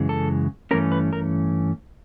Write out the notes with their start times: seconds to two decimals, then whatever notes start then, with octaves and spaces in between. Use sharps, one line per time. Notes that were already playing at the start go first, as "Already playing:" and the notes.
Already playing: F#2 C#3 E3 G#3
0.09 A4
0.71 G2 E3 A3 C#4 A#4
0.92 B4
1.13 A#4